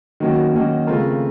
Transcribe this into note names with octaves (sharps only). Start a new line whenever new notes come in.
D#3 F#3 A#3 C#4 F#4
D#3 F#3 A#3 C#4 F#4
C#3 A3 C4 F4 A#4